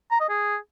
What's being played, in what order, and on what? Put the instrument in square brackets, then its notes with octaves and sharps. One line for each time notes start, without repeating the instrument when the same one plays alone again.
[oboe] A#5
D#5
G#4